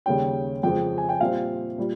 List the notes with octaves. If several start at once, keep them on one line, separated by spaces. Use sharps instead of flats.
D#2 C#3 G3 C#4 G5
F2 C#3 G#3 C4 G5
G#5
G5
A#2 G3 C4 F5
A#2 G3